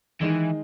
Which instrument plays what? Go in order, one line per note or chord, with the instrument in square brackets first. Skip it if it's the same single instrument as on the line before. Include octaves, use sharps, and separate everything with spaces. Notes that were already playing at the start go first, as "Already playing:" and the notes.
[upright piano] D#3 G#3 D#4 [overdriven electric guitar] E3